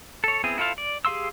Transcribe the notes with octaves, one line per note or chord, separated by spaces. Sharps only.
A4 C#5
B3 C4 E4 G#4
E4 F4 A4 C5 F5
D5
G4 G#4 F5 C6 E6